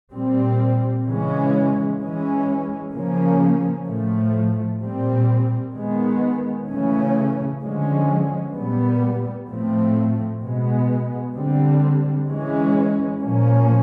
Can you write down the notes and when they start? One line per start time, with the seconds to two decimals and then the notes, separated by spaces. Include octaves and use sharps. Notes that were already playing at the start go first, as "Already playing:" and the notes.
0.14 A#2 G3 C4
1.06 C#3 E3 G#3 C#4
2.01 E3 G#3 C#4
2.94 C#3 F3 A#3 C#4
3.88 A2 F3 A3
4.82 A#2 G3 C4
5.75 D#3 G#3 B3
6.68 C#3 E3 A3 C#4
7.62 D3 F3 G#3 C#4
8.55 A#2 G3 B3
9.48 A2 F3 A3 C4
10.42 B2 G#3 B3
11.35 D3 G3 C4
12.29 E3 G#3 C#4
13.23 A#2 F3 A#3 C#4